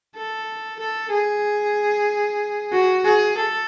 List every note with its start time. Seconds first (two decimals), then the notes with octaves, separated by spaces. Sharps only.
0.16 A4
0.79 A4
1.11 G#4
2.73 F#4
3.05 G#4
3.37 A4